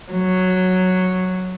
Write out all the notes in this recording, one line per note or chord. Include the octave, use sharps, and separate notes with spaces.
F#3